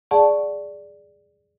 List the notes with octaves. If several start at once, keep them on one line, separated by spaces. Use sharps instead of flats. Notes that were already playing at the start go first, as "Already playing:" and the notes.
G#4 D5 F#5 A5 C#6